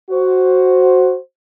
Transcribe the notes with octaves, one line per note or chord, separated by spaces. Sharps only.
F#4 C5